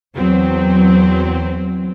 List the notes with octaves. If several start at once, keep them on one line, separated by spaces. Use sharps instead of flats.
E2 F#3 C4